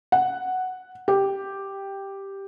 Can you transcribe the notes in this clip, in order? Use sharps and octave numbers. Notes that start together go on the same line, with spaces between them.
F#5
G4